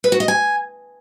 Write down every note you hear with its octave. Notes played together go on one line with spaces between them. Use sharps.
B4
F#4
D#5
G#5